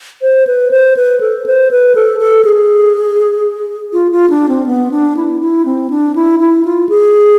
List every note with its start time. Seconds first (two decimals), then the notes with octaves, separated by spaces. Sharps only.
0.22 C5
0.47 B4
0.71 C5
0.97 B4
1.20 A4
1.46 C5
1.71 B4
1.95 A4
2.19 A4
2.45 G#4
3.93 F4
4.12 F4
4.30 D4
4.49 C4
4.66 B3
4.91 D4
5.17 E4
5.40 E4
5.65 C4
5.90 D4
6.15 E4
6.39 E4
6.65 F4
6.89 G#4